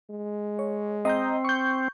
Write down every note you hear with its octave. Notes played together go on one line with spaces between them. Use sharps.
G#3
C#5
C4 D#5 A#5 G6
C#6 G6